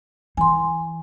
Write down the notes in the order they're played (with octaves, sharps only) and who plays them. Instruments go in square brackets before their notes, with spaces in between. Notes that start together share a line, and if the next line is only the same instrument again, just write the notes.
[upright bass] E3 [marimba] G#5 C6